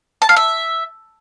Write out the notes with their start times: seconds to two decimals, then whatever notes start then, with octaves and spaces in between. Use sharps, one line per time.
0.22 A5
0.29 F5
0.36 E5